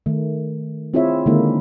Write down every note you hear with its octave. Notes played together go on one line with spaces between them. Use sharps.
D#3 A3
C4 E4 F4 G#4 C#5 E5
D3 D#3 G#3 A#3 D#4 E4